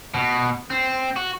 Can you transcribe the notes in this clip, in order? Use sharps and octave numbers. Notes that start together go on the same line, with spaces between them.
B2
C4
F#4